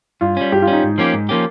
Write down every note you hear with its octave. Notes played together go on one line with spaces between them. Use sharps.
G2 F4
G3 C#4
G2 G4
F4
G3 C#4
D#4
G#2
F3 A#3 C#4 G4
G#2
F3 A#3 C#4 G4